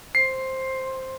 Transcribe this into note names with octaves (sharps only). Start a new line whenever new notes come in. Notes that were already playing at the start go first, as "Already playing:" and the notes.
C5 C7